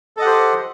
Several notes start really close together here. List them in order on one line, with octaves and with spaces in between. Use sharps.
A4 D#5 F#5 G4 C5